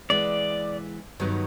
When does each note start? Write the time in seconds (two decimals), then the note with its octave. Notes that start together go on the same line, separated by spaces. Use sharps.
0.10 E3 G#3 B3 D5
1.20 G2 D#3 F#3 B3